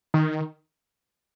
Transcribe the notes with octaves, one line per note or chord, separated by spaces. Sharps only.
D#3